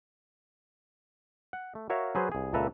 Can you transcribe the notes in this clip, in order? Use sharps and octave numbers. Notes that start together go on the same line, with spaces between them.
F#5
A3
F#4 A#4 C#5 E5 F5
F#3 G#4 B4 C5
C2 G#4
C#2 A#2 A4 B4 E5 A#5